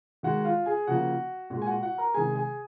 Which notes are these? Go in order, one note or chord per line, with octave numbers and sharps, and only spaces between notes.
D#3 G#3 F#4 F#5
F4 F5
G#4 G#5
C#3 F3 A#3 F#4 F#5
A#2 G#3 F#4 F#5
G#5
F#4 F#5
F#4 F#5
A#4 A#5
C3 D#3 G#3 G#4 G#5
G#4 G#5